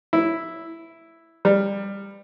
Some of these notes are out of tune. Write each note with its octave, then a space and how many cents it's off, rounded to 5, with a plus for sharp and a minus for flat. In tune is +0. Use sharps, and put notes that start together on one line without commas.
E4 +0
G3 +20